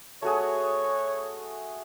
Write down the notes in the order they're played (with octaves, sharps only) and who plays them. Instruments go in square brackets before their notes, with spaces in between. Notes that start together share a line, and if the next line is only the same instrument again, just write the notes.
[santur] A3 F#4 G#4 [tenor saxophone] C#5